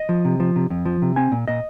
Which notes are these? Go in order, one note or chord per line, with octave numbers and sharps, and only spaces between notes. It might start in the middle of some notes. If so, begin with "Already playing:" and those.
Already playing: D#5
F3
C3
F3
C3
F2
F3
C3
C4 G#5
A#2
A#2 D#5